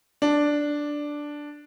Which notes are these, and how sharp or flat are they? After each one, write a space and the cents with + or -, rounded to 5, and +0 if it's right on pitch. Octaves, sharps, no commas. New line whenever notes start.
D4 +0